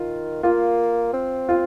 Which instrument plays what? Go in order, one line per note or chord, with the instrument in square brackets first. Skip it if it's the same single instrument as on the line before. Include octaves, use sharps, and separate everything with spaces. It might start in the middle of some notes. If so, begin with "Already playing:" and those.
Already playing: [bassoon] D#3 [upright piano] F4
[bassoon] A#3 [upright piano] F4
[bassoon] C4
[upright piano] F4